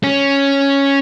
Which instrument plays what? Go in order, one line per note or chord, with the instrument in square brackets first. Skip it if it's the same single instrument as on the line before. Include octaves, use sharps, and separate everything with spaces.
[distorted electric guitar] C#4